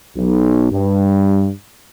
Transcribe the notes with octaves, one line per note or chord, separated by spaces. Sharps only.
B1
G2